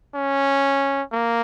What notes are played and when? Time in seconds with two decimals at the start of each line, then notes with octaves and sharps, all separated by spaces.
0.15 C#4
1.12 A#3